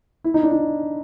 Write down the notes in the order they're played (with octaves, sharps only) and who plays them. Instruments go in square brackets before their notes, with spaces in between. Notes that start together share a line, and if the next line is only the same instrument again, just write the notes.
[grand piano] E4
D#4
D4
D#4